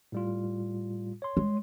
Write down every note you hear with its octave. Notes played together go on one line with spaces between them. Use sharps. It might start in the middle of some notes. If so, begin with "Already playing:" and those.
A2 G3 F4
C#5 C6
G#3